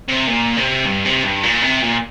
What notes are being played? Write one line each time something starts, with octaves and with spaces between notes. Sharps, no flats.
C3
A#2
C3
G2
C3
G2
A#2
C3
A#2